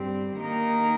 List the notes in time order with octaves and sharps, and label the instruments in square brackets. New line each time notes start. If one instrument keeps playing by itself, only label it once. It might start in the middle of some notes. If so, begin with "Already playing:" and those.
Already playing: [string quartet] G2 G3 C4 [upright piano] G4
[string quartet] D#3 A#3 D#4 A#4